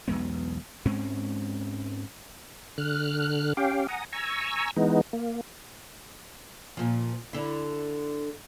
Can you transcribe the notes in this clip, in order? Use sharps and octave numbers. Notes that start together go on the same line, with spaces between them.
B1 E2 G#3 B3
G#2 G#3 C4 C#4
D3 F6 F#6
C#4 G4 F5 G5
F#5 G#5 A#5 D#6
G#5 A#5 C#6 E6
E3 G#3 B3 D#4
A#3
A#2 F3
D3 E4